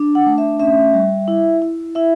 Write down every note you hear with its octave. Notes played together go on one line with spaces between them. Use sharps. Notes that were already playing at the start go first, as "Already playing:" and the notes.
Already playing: D4
F#5
A3
E5
C#4 E5
G3
E4
E4
E4 E5